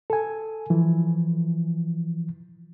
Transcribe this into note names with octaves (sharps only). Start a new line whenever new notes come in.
A4 G#5
E3 F3